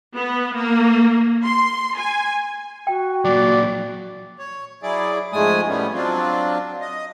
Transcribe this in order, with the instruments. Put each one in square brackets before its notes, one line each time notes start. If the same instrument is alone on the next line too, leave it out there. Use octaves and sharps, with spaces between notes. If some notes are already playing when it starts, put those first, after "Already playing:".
[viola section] B3
A#3
C6
G#5
[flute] F#4 [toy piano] G5
[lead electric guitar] A#2 F#3 [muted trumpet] D5
[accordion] C#5
F#3 E4 G#4 D5
F2 G#2 G#3 A3 G#5 D#6
A2 G3 A3 B3 C#4
F#3 C4 D4 F4
D#5